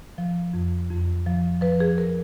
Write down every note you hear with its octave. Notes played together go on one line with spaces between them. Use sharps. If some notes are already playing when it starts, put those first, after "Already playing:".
F3
F2
F2
F3
F3 B4
G#4
A#4